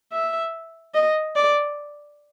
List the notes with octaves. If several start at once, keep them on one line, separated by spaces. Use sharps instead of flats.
E5
D#5
D5